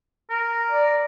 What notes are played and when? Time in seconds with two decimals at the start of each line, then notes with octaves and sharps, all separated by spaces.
0.30 A#4
0.71 D5